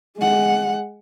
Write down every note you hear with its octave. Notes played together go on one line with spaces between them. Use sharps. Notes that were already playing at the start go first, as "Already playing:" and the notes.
G#3 F#5